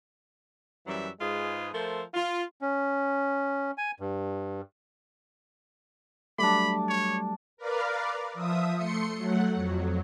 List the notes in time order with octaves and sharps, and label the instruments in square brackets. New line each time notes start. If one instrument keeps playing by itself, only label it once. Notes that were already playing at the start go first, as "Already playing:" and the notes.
[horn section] F#2 E3 F#3 G3 E5
G#2 G#3 F4 G#4 B4
F3 A3 A4 A#4 C5
F4
[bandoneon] C#4
G#5
G2
[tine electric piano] F#3 G3 A3 [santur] D4 D6 [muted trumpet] B5
[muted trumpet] C#5
[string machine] A#4 B4 D5 F5
F3 E5 D#6
A3 C6 C#7
F#3 A3 F#5
F2 F#3